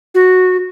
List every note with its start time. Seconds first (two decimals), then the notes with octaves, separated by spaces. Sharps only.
0.15 F#4